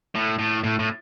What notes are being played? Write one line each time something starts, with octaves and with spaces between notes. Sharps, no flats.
A2
A2
A2
A2